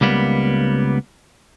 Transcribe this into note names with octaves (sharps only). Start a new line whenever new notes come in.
C#2 G3 A#3 B3